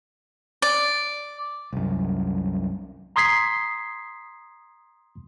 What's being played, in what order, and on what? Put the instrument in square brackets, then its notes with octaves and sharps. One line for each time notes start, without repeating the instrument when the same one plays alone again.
[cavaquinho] D5
[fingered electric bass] C2 F#2
[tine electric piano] A#5 C6 D#6 G#6 B6 C7